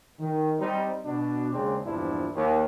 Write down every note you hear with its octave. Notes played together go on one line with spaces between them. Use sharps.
D#3
G3 C4 D#4
B2 D4
D#2 C#3 G#3 C4 D4
A#1 E2 G2 F3 D4 E4
D#2